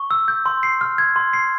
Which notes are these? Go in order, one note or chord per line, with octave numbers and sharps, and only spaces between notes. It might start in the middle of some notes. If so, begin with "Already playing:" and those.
Already playing: C#6
E6
G6
C6
C7
F6
G#6
C6
C7